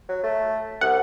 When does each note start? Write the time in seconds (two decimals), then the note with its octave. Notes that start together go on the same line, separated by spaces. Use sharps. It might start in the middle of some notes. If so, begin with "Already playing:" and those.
0.09 F#3
0.23 A3
0.81 C2 F#5